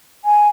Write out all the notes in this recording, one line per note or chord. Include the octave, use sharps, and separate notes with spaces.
G#5